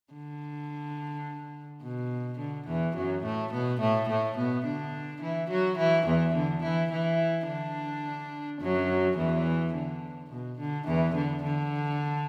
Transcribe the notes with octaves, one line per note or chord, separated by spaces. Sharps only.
D3
B2
D3
E2 E3
F#2 F#3
A2 A3
B2 B3
A2 A3
A2 A3
B2 B3
D3 D4
E3 E4
F#3 F#4
E3 E4
E2 E3
D3
E3 E4
E3 E4
D3 D4
F#2 F#3
E2 E3
D3
B2
D3
E2 E3
D3
D3